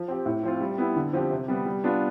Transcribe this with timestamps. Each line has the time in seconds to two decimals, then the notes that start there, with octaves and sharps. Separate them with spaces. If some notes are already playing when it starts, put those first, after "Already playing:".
Already playing: F3
0.08 C4 G4
0.26 A2
0.43 F3 C4 F4
0.61 G3
0.78 B3 E4 G4
0.96 D3
1.13 F3 C4 G4
1.31 C3
1.48 G3 B3
1.66 G3
1.84 B3 D4 F4